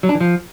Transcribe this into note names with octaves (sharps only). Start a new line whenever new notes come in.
F#3
D4
E3
F3